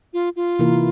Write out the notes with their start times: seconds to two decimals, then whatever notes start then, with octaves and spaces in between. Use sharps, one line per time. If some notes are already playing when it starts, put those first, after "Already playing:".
0.13 F4
0.36 F4
0.59 C3 E3 A#3 E4 A#4